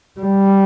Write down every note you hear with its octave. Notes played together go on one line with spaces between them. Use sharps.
G3